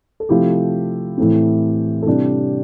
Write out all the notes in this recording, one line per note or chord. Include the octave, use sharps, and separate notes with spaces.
A4
C3 F3 A3 E4 G4
A2 E3 A3 C4
A4
C3 G3 D4 E4 G4